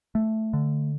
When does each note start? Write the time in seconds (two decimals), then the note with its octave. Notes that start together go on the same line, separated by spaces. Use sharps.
0.15 A3
0.53 D3